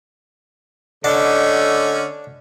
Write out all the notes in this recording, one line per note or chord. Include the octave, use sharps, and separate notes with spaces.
D3 A3 C#4 D4 D#5 F#5